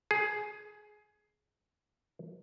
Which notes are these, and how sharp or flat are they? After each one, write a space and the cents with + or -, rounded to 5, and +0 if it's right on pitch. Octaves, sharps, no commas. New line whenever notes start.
G#4 +15